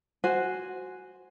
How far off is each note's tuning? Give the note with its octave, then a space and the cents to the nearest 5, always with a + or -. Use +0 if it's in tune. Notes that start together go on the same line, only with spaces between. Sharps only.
F#4 +0 C5 +0 G#5 +0